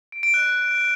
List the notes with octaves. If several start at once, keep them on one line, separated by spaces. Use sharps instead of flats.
D7
D7
F#6